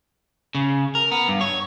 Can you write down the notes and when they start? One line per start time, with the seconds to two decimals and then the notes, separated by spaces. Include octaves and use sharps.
0.55 C#3
0.95 A#4
1.11 B3
1.28 G2
1.41 C#5